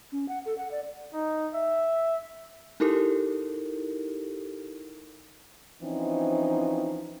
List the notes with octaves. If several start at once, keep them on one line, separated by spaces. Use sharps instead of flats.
C#4
F#5
A4
F#5
D5
D#4
E5
D#4 E4 G4 A4 A#4
E3 F3 C4 C#4 D#4